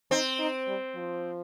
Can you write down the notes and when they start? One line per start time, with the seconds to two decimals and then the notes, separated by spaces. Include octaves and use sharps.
0.11 C4 D#4
0.39 D#4
0.68 G3
0.95 F3